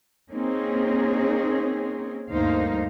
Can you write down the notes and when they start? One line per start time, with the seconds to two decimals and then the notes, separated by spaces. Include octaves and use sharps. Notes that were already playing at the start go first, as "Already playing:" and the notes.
0.31 A#3 C4 C#4 D#4 G#4
2.31 D2 G2 A#3 D#4 C5 F5